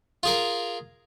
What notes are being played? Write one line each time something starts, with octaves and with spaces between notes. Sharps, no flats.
F4 G#4 A#4